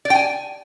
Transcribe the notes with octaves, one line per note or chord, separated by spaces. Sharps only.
D5
G5
G#5